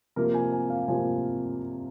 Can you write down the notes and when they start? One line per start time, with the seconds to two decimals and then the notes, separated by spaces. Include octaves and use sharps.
0.16 C3 F3 A#3 A#4
0.34 G#5
0.52 G#5
0.70 F5
0.88 C3 F3 A#3 G#5